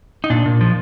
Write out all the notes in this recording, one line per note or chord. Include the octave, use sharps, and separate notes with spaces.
D#4
A#2 D4
A#2
F3